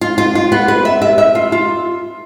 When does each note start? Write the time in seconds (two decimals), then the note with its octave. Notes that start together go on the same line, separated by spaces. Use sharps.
0.01 F4
0.18 F4
0.35 F4
0.52 B3
0.68 B4
0.85 E5
1.02 E5
1.18 E5
1.35 F4
1.52 F4